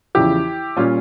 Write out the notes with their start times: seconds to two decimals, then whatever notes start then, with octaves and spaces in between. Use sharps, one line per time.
0.15 E2 C#3 F3 E4 G4
0.77 A#2 G3 C#4 F4